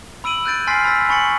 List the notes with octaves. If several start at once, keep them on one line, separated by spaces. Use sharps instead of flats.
B5 E6 D7 D#7 F#7
F#6 G6 A6 D7
G#5 C6 F6 A6 B6 C7
B5 E6 A6 B6
G#5 B5 C#6 A6 C#7 F#7